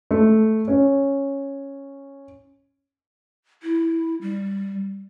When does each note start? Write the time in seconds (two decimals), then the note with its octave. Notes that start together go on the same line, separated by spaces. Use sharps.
0.11 A3
0.68 C#4
3.63 E4
4.22 G3